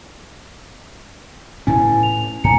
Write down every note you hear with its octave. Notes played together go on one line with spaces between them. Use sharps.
A2 C#4 E4 G#5
F7
G#2 G#5 A#5 C#7